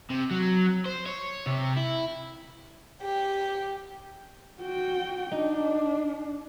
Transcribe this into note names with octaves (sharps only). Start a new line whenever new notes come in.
C3
F#3
C5
C#5
C3
E4
G4
F#4 G5
D4 D#4